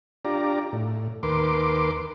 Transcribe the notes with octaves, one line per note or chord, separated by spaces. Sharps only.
D4 F4 G4 D5 A#5
A2
D#2 A#4 B4 C6 D6